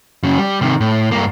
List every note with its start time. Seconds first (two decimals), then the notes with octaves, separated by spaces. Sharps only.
0.23 F#2 C#3
0.38 G3
0.61 C3 D#3
0.80 A2
1.12 G2 A#3